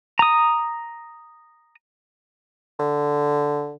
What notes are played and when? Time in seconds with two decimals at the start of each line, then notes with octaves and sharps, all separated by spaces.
0.19 A#5 D#6
2.79 D3